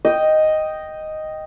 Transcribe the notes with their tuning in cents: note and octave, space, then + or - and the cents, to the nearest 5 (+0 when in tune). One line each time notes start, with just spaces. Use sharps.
D#5 +0 G5 -5